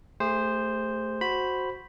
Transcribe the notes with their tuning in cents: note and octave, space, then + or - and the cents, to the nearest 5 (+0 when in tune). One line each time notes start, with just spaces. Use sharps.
A3 +0 G#4 -40 C5 +0
F#4 +0 C5 +0 B5 +0